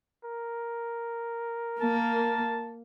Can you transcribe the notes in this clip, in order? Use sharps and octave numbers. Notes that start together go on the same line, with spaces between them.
A#4
A#3 A5